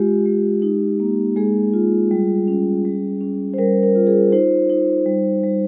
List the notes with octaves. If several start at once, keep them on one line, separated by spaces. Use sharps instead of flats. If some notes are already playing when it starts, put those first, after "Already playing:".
Already playing: G#3 F4 G4
G#3
D#4
A#3
G#3 G#4
F4
G3
C#4
G3
C#4
C5
G3 A#4
A#4
F4
G#4
D#4 C5
D#4
G3
G3